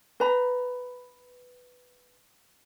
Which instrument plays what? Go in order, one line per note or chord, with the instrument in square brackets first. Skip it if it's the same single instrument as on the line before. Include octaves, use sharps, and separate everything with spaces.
[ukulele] B4 A#5 B5